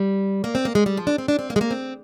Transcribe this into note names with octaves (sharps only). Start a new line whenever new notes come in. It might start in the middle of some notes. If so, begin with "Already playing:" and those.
Already playing: G3
A#3
C4
A#3
G#3
G3
F3
D4
C4
D4
C4
A#3
G#3
A#3
C4